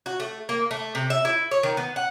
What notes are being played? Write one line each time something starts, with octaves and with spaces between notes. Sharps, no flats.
F#4
A3
A#3
A3
C3
E5
E4
C#5
D#3
B3
F#5